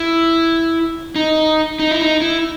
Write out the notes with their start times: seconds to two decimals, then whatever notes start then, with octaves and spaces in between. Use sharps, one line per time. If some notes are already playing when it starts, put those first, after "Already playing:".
Already playing: E4
1.16 D#4
1.79 D#4
1.91 E4
2.01 D#4
2.22 E4